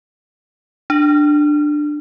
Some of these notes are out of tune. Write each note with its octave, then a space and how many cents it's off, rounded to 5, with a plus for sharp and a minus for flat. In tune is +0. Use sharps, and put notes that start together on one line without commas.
D4 +15